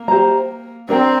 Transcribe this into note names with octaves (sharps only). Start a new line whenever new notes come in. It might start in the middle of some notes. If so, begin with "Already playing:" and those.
Already playing: A#3
G4 C5 A#5
C4 D4 A#4 G5 A#5